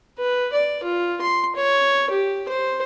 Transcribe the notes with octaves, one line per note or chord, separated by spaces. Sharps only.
B4
D5
F4
C6
C#5
G4
C5